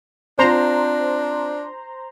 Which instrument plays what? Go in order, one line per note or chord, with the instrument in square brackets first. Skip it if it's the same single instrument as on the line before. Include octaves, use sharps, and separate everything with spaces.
[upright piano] C4 F4 [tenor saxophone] D4 [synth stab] C5 A#5 C6